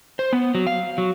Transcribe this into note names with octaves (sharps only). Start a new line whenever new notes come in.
C5
B3
F#3
F5
F#3